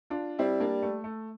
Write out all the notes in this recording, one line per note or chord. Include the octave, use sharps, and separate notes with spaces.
D4 F4
G3 C4 E4
A#3 D4
A3
A3